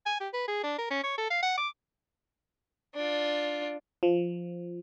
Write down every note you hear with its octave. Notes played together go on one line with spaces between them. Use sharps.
G#5
G4
B4
G#4
D4
A#4
C#4
C#5
A4
F5
F#5
D6
D4 F4
F3